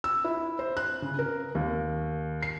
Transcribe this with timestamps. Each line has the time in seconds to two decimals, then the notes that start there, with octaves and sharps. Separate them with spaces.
0.04 E6
0.24 E4
0.59 C5
0.77 F#6
1.02 C#3
1.19 A#4
1.55 D#2
2.43 C7